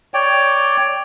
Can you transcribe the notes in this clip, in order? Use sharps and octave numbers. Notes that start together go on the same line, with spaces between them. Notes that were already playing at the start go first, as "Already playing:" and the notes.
C#5 D5 G5